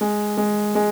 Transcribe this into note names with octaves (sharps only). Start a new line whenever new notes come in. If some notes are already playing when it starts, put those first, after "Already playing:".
G#3
G#3
G#3